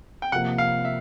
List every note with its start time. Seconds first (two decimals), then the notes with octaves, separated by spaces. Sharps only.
0.22 G5
0.32 C3 F3 A#3 F#5
0.58 F5
0.85 E5